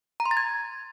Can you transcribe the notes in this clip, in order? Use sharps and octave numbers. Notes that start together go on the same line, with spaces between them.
A#5
C6
A6
G#6